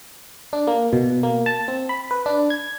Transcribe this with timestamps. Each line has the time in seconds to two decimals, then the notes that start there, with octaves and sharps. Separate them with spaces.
0.53 D4
0.67 A#3
0.93 B2
1.23 A#3
1.46 A5
1.68 C4
1.89 B5
2.11 B4
2.26 D4
2.50 G#6